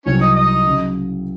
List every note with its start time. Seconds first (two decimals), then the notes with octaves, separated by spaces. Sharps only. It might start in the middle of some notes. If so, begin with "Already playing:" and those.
0.06 C2 C3 F#3 C4 C#4 C#5
0.21 D#4 D#5
0.35 D#4 D#5
0.67 C#3 F#3